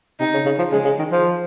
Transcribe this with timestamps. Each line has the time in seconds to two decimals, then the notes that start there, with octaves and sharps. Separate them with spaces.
0.20 C3 D#4
0.33 C#3
0.46 C#3
0.58 F3
0.72 C#3 G#3
0.84 C#3
0.99 D#3
1.11 F3